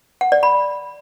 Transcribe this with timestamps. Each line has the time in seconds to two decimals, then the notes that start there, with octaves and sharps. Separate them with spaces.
0.21 F#5
0.32 D5
0.43 B5